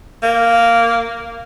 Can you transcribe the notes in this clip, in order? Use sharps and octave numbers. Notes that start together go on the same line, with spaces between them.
A#3